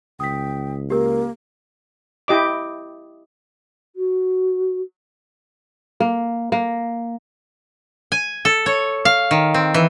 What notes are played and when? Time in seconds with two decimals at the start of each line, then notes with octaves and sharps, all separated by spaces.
0.20 C#2 G5 D#6 B6
0.90 A#3 G4 A#4
2.28 E4 G4 D#5 D6
3.96 F#4
6.00 A#3
6.52 A#3
8.12 G#5
8.45 A4
8.66 C#5
9.05 F5
9.31 D#3
9.54 C4
9.74 E3